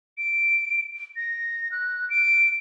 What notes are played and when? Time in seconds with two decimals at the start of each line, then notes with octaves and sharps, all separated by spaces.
0.18 D7
1.16 A#6
1.71 F#6
2.10 D7